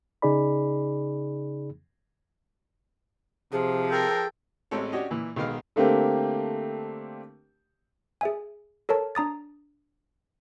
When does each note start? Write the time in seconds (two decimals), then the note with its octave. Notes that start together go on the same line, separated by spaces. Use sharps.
0.22 C#3 D#4 G#4 D5 B5
3.52 C3 F3 G#4
3.90 A4 A#4 G5
4.71 A1 G#3 C4 A4 C#5
4.92 C#4 D4 F#4 G4 C#5 D#5
5.11 A#2 E3
5.36 B1 D#3 G#3 B3 F5
5.76 D3 A3 A#3 C4 G4
8.21 G#4 E5 G#5
8.89 A4 A#4 C#5 A5
9.15 D4 A#5 D#6 A6